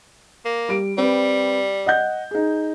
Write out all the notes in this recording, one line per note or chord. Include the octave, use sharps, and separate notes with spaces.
A#3
G3 D7
G3 C4 B4
D#5 F#5 G6
D#4 G#4